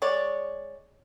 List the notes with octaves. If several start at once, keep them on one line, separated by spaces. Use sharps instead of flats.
G#3 C#5 D5